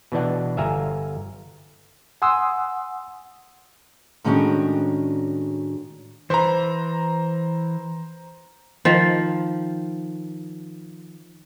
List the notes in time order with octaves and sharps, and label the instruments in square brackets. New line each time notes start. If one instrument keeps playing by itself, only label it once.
[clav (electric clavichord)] B2 E3 D4 F#5
G1 E5 F5 G#5 A#5
[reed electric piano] F#5 G#5 C6 D#6 E6
[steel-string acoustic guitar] A2 D#3 G#3 C#4 D4 F#4
[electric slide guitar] E3 B4 [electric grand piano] C5 A#5
[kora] D#3 F3